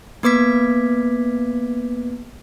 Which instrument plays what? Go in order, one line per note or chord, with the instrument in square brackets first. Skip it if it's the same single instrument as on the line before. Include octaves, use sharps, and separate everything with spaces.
[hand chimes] A#3 B3 B4 D6 G#6 B6